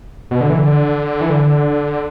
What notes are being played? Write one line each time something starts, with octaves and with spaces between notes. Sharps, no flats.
B2
D3
E3
D3
E3
D3